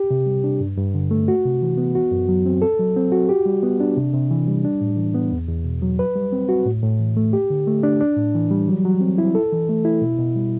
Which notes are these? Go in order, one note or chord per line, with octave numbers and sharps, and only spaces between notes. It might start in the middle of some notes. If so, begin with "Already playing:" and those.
Already playing: G4
C3
G3
D4
G2
G2
D3
A3
F#4
C3
E3
B3
F#4
F#2
F#3
C4
A4
F#3
C4
F#4
G4
G3
B3
D4
C3
C3
E3
G3
D4
A2
E3
B3
E2
E2
B2
F#3
B4
G3
C4
F#4
A2
A2
E3
A3
G4
D3
A3
D4
D4
A2
E3
G3
F#3
F#3
C4
E4
A4
E3
A3
E4
B2
B2
G3